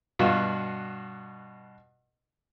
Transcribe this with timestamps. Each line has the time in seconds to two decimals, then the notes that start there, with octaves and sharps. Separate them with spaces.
0.19 G2 B2 F4 F#4